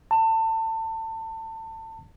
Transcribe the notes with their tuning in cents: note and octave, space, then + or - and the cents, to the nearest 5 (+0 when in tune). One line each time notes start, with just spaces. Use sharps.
A5 +30